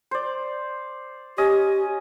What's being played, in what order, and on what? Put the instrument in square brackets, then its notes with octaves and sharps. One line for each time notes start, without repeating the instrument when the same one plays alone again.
[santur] C5 D5
[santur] C#4 D#5 [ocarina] G4